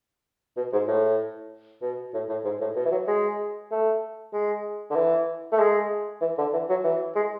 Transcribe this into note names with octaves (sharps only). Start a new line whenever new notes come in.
B2
G#2
A2
B2
A2
A2
G#2
A2
B2
E3
F#3
G#3
A3
G#3
D3
E3
A3
G#3
E3
D3
E3
F#3
E3
G#3